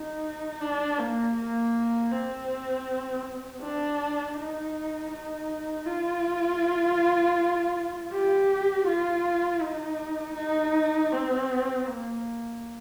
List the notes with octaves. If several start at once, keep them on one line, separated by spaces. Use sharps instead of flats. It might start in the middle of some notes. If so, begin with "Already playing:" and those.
Already playing: D#4
D4
A#3
A#3
C4
D4
D#4
D#4
F4
G4
F4
D#4
D#4
C4
A#3